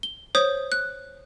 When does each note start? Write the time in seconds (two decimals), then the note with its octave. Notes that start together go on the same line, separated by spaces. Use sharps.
0.03 G7
0.35 C5 C#5 D#6 G6
0.72 F#6